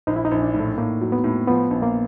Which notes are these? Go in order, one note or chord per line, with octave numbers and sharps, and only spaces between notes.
A#1 D#4
E4
D#4
A#1
D4
A2
A3
A2 A#3
F#3
B3
A2
F3 B3
A#1
A#3